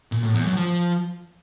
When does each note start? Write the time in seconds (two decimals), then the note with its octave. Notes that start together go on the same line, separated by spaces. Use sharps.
0.12 A#2
0.23 A2
0.34 E2
0.45 F#2
0.56 F3